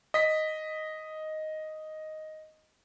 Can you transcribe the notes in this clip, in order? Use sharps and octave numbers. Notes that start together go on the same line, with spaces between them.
D#5 B6